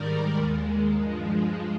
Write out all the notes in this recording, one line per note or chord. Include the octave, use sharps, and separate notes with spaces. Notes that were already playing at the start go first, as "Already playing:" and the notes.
Already playing: G#2 D#3 G3 A#4 D5
D#2 D#3 G#3
G2 F3 G#3